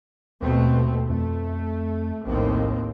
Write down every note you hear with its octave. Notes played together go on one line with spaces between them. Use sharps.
D#2 B2 A3 C4
F2 A3
A#1 D#2 A2 C4